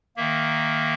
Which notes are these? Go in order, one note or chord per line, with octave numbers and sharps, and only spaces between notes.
D#3 A#3 E5